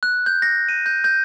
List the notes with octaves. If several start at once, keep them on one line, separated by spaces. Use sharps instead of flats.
F#6
G6
A#6
D#7
G6
G6